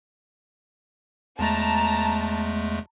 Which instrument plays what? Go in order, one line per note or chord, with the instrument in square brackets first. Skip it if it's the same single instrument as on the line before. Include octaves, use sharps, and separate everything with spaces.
[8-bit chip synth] E2 G#3 A3 [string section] A5 A#5